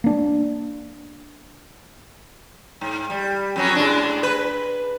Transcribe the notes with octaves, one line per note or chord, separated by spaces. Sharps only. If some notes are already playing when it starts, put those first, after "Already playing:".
A#3 D4
G#2
G3
F2 F#3 C#4
A2 G#3 D4
B4